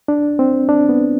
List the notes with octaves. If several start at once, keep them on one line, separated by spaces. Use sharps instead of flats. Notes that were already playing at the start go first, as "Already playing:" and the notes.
D4
C4
D4
B3